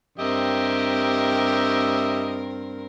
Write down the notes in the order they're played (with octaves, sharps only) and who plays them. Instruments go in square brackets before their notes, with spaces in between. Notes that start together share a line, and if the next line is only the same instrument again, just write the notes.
[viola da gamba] G2 C4 A#4 [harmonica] G4 D#5 E5